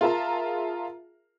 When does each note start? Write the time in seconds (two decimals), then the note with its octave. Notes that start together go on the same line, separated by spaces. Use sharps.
0.01 F4 G#4 A#4 E5 A5 A#5